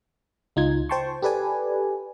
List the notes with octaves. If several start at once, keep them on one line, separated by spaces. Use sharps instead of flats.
C#2 D#4 F4 G#6
C5 G5 A5 C6 C#6
G4 A4 B4 D5 G#5